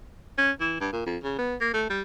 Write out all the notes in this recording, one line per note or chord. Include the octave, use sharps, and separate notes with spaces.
C#4
E3
G2
A#2
F2
C#3
B3
A#3
A3
G3